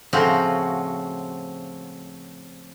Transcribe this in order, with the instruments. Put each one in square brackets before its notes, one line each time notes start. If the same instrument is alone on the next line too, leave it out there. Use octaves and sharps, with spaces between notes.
[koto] A2 C#3 F3 C4 F#4